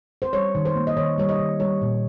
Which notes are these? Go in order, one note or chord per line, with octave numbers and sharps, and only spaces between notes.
C5
G3 C#5
D#3
C5
A#3
D#5
D#3 C#5
G3 C#5
D#5
D#3
G3 C#5
A#2